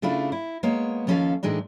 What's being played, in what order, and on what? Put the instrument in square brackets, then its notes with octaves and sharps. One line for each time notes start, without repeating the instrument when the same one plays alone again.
[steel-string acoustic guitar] C#3 A3 D4 E4 F4
E4
G#3 A#3 B3 C#5
D#2 F3 C#4 F4 A4 F5
A2 E3 G#3 D4 D#4